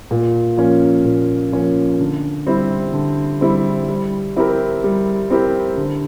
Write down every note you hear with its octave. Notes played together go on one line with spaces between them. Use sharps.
A#2
F3 A#3 C#4
A#2
F3 A#3 C#4
D3
G3 C4 E4
D3
G3 C4 E4
G3
C4 E4 G4 A#4
G3
C4 E4 G4 A#4
D3